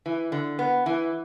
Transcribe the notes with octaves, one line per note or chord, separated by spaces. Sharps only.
E3
D3
B3
E3